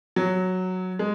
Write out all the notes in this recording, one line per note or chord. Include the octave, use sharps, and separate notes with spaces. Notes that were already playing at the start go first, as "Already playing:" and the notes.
F#3
G#3